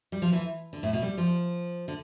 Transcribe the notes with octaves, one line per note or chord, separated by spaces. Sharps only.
G3
F3
E3
D3
A2
B2
G3
F3
D3